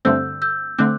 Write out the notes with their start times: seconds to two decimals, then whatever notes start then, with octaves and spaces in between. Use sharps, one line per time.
0.05 G2 D3 A3 C4 E6 G6
0.42 E6 G6
0.78 D3 A3 C4 D6 F#6